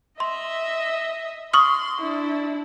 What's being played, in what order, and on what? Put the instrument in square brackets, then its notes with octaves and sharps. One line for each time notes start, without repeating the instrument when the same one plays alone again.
[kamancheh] D#5 E5 [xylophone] C6
[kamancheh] C6 [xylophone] C#6 D#6 F6
[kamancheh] D4 E4